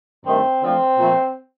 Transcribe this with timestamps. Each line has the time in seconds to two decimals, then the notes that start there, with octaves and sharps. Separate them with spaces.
0.25 G2 D#3 A3 C4
0.62 D3 F3 A3 C4
0.98 A#2 F3 A3